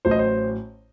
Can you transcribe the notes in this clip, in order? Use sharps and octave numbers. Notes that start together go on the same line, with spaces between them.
A1 A2 F#3 C5
D#5
C5